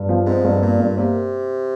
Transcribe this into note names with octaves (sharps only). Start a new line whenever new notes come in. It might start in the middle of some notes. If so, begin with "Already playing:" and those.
Already playing: G2
F3
G#2 C4
G2
A#2 A#3
G2
C3 A#3